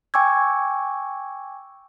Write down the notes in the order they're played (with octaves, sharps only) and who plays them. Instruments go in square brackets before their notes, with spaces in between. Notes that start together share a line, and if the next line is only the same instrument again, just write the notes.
[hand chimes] G5 G#5 C#6 D6 E6 G#6